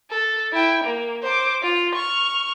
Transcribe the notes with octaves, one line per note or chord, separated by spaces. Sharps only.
A4
E4 G5
A#3
C5 D6
F4
C#6 F6